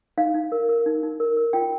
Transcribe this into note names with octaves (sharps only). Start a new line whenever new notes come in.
D#4 F5
D#4
A#4
A#4
D#4
D#4
A#4
A#4
F4 G5